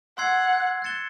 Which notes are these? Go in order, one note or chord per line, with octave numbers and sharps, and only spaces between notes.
F#5 C6 E6 G#6 C7
F#6 A6 C#7 E7 G7